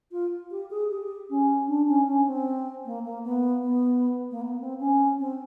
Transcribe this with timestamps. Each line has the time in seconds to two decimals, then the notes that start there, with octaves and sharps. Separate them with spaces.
0.11 F4
0.51 G4
0.70 G#4
0.90 G4
1.30 C#4
1.67 D4
1.87 C#4
2.07 C#4
2.27 C4
2.85 A#3
3.05 A#3
3.25 B3
3.63 B3
4.31 A#3
4.41 B3
4.60 C4
4.80 C#4
5.19 C4